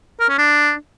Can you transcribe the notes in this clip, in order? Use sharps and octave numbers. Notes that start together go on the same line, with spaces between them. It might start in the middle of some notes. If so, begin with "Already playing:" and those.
A#4
C#4
D4